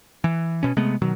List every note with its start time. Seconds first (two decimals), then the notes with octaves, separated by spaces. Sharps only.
0.24 E3
0.63 B2 C#4
0.77 C3 G#3 A3 B3
1.02 B2 D#3 F#3